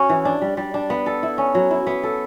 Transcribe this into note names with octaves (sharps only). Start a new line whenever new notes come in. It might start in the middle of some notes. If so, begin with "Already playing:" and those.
Already playing: C#4 F#4 C#5
E3
D4
G3
G3
D4
B3
A4
E4
C#4
F#3
E4
B3
A4